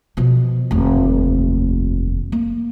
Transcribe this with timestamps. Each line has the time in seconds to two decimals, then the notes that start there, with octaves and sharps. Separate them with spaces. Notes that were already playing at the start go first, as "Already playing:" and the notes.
0.17 B2 F3
0.71 F1 D#2
2.32 A#3